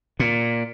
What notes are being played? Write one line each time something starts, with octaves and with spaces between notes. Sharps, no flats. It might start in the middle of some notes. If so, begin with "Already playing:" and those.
A#2